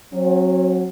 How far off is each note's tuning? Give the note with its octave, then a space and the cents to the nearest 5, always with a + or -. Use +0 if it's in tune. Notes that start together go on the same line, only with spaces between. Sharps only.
F#3 -10 C4 +35